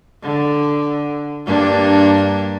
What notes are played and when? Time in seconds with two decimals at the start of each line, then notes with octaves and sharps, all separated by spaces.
0.23 D3
1.47 G2 A#3 D4